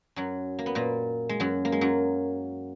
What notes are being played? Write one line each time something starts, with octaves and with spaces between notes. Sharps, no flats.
F#2 F#3
A#3
B3
A#2 A#3
G#3
F#2 F#3
A#3
G#3
F#2 F#3